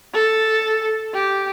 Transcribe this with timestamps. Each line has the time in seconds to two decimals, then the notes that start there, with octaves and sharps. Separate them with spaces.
0.14 A4
1.14 G4